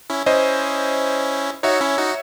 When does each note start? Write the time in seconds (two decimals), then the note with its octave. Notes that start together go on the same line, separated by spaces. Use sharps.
0.10 C#4 E4
0.26 C#4 E4 C5 D#5
1.63 D#4 F#4 C#5 E5
1.81 C#4 E4
1.98 D#4 F#4